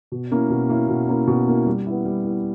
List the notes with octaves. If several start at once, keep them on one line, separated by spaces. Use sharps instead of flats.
B2
A#3 C#4 E4
B2
A#3 C#4 E4
B2
A#3 C#4 E4
B2
A#3 C#4 E4
G3
B3 E4
G3
B3 E4